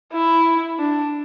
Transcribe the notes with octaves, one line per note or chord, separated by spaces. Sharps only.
E4
D4